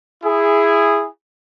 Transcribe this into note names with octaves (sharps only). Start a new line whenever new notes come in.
E4 G#4